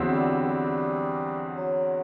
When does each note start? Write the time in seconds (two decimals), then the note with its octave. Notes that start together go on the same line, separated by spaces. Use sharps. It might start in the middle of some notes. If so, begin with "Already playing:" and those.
Already playing: E2 D3 F#3 C4 E4
0.12 G3
0.42 G3
1.57 F#3